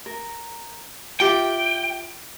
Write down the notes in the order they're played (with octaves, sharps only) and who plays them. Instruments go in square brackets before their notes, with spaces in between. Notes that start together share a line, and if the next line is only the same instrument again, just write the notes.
[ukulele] A#4
[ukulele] E4 F4 G4 [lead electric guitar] G5